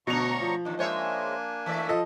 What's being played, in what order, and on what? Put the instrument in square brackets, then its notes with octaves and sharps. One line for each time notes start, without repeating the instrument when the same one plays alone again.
[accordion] D2 A#5 C#6 [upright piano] B2 F7 [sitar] C#4 D4
[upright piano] F3
[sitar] D#2 D#3 [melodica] D4
[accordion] G#3 [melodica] A#3 D4 G#5 [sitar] C5 C#5 E5
[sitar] E3 A3 D5 [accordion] E5
[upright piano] F3 A4 D#5